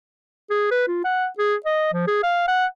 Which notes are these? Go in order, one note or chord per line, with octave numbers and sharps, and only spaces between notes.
G#4
B4
F4
F#5
G#4
D#5
F3
G#4
F5
F#5